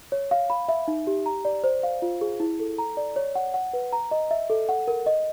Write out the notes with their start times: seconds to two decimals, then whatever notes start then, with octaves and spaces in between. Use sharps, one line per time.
0.12 C#5
0.31 F5
0.50 B5
0.68 E5
0.88 D#4
1.07 G4
1.26 A#5
1.45 D5
1.64 C5
1.83 F5
2.02 F4
2.21 G#4
2.40 E4
2.60 A4
2.78 A#5
2.97 D5
3.16 C#5
3.35 F#5
3.54 F#5
3.73 B4
3.93 A#5
4.11 D#5
4.31 E5
4.50 A4
4.69 F#5
4.88 A#4
5.06 D#5